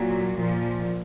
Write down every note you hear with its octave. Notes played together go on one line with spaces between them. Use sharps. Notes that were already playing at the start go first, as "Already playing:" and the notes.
Already playing: A#2 F#3
A#2 F3